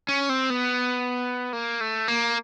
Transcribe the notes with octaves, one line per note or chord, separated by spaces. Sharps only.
C#4
C4
B3
A#3
A3
A#3